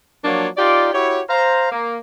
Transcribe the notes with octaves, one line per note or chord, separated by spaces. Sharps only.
F3 F#3 A#3 D4 F4 C#5
D#4 F4 G4 D5
E4 F#4 G4 C#5
C5 F5 A#5
A#3